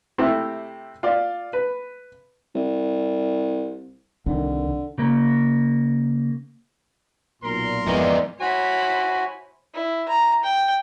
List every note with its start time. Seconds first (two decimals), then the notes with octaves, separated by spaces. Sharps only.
0.18 C3 A3 C4 E4 G4
1.03 F4 D5
1.53 B4
2.55 C2
4.26 C2 D3 D#3
4.98 C#3 A#3
7.42 B1 A#2 A#4 C6
7.87 F2 G#2 E3 B3 D#4 D5
8.40 E4 F#4 C5 C#5 G#5 B5
9.74 E4
10.09 A#5
10.43 G5